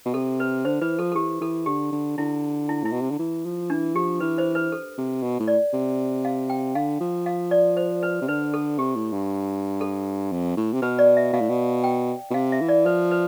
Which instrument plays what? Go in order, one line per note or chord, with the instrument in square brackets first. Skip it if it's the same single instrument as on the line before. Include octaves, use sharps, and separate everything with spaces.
[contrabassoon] B2
[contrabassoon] C3 [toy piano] A4
[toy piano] B4
[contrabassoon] D3 [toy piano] C5
[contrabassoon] E3 [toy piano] B4
[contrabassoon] F3 [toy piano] A4
[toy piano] A4
[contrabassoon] E3 [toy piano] G4
[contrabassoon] E3 [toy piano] A4
[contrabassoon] D3 [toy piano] G4
[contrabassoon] D3
[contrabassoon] D3 [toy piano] E4
[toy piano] E4
[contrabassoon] A2 [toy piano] E4
[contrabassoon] B2
C3
D3
E3
F3
[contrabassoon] E3 [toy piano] D4
[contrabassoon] F3 [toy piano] G4
[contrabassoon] E3 [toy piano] B4
[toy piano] C5
B4
A4
[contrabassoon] C3
B2
A2
[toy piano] D5
[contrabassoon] C3
[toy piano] F5
G5
[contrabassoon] D3 [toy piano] F5
[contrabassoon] F3
[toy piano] F5
D5
C5
B4
[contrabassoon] C3
[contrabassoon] D3 [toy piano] B4
[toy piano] A4
[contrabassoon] C3 [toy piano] G4
[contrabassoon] A2
G2
[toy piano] A4
[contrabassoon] F2
A2
C3
[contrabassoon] B2 [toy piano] B4
[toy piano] D5
E5
[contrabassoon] B2 [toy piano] F5
[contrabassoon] A2
B2
[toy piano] G5
[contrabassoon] B2
[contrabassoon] C3 [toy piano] F5
[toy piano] E5
[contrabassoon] E3
[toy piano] D5
[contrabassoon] F3 [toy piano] B4
[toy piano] B4